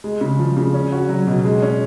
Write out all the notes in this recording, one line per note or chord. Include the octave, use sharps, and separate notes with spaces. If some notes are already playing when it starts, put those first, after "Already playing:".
G#3
C#3
F3
C#3
C#4
F#4
F#3
B2
G#3
C#4